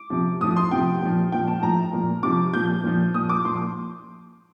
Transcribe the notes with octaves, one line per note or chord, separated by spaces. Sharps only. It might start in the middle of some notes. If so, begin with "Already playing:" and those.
Already playing: D6
C3 F3
A2 F3 D#6
C6
C3 F3 G5
A#2 F3
A#2 F3 G5
A5
A2 F3 A#5
A#2 F3
C3 F3 D6
A#2 F3 G6
A#2 F3
A#2 F3 D#6
D6
A#2 F3 C6